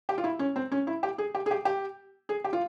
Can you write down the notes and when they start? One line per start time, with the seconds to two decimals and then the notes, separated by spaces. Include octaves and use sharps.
0.09 G4
0.18 F4
0.24 E4
0.39 C#4
0.56 C4
0.72 C#4
0.87 E4
1.03 G4
1.18 G#4
1.35 G4
1.46 G#4
1.51 G4
1.65 G4
2.29 G#4
2.44 G4
2.53 F4